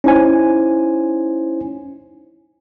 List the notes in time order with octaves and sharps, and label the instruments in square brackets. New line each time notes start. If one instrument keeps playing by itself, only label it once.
[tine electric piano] C#4 D#4 E4 C5 G#5